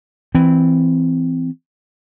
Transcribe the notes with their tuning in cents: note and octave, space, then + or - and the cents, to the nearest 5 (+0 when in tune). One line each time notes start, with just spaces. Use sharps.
E3 +0 C4 -15